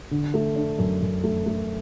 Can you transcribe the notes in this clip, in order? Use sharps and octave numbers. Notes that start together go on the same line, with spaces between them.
D3
A3
D4
F#2
F#2
A3
A3